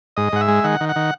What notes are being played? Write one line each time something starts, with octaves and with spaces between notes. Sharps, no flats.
G#2 D#5
G#2 F#5
E5
G#3
D#3 F#5
D#3
F#5
D#3